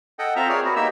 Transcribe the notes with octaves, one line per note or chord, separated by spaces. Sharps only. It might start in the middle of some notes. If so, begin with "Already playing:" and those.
A4 D#5 F#5 G5
C4 F4 E5 A#5
G#4 A#4 C#5 D5
B3 F#4
A#3 D#4 G4 E5 E6